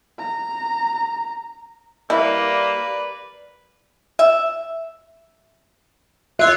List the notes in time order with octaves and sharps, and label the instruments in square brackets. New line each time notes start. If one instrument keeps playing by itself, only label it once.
[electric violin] A#5
[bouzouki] G3 [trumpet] A#3 [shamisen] E4 [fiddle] B4 D5
[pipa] E5
[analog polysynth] F4 C#5 [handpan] E5 [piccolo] F#6